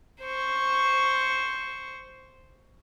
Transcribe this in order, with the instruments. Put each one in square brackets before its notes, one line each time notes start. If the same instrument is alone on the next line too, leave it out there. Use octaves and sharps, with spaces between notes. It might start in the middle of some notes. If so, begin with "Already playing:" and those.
[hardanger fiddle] C5 C#6